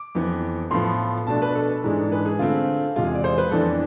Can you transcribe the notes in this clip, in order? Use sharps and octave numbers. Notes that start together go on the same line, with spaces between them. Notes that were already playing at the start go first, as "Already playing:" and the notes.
Already playing: D6
F2 E3 B3
A2 F3 B3 C6
B2 A3 D4 A5
B4
A4
G#2 E3 G#3 D4
B4
G#4
D3 A3 C4 F4
E2 C3 G#3 F4
G#4
D5
C5
B4
F2 E3 B3 D4 A4